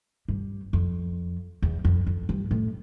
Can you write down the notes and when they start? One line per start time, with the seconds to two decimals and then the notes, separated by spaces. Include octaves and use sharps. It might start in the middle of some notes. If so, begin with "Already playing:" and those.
0.28 G2
0.73 F2
1.62 E2
1.85 F2
2.07 F2
2.29 G2
2.51 A2